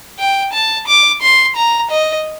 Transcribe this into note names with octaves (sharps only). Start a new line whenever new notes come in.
G5
A5
D6
C6
A#5
D#5